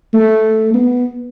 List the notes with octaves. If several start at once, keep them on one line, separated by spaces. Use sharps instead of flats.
A3
B3